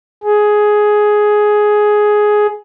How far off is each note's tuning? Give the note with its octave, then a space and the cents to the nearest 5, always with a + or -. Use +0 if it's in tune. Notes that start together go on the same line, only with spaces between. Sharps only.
G#4 +10